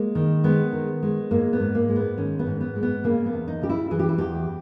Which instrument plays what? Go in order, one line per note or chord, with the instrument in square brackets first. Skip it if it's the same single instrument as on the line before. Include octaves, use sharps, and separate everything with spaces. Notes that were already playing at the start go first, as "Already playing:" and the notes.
Already playing: [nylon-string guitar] G#3 A#3
D#3
G#3 B3
D#3
G#3
G#2 A#3
B3
G#2
A#3
G#3
B3
D#3 C#4
B3
G#2
B3
G#3
B3
C#3 A#3
B3
E2
D#4
C#3 G4
E4
E3 G#4
G4
E4
E2 G4